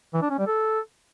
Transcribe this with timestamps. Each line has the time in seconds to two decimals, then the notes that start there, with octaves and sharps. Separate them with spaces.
0.14 E3
0.22 D4
0.30 C#4
0.39 G3
0.47 A4